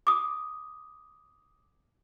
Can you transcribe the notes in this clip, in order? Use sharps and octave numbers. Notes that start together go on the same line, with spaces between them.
D6 D#6